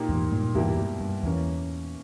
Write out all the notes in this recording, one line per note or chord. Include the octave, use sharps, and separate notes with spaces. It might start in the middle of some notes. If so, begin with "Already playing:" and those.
Already playing: A#2 A#3 D#4 G4
E2 G#2
G2 A#2
E2 G#2 B2 G3 A#3 E4 G4
G2
G2
E2 E3 A#3 C#4